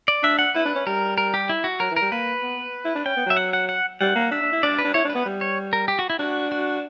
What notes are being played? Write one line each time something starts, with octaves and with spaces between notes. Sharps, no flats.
D5
D4 E5
F#5
E4 B4
D4
C#4
G3 A#4
A#4
G4
E4
F#4
F#3 A#4
E3
A#4
G3
A#3 B4
B3
E4
D4
C#4 G5
B3
F#3 E5
F#5
F#5
F#5
G3 F#5
A#3
D4 E5
D4
E4
D4 D5
B4
D4
E4 C#5
D4
B4
B3
G3
C#5
A#4
G4
F#4
E4
D4 F#4
F#4